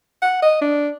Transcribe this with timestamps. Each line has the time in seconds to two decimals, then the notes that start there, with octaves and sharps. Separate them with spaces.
0.22 F#5
0.42 D#5
0.62 D4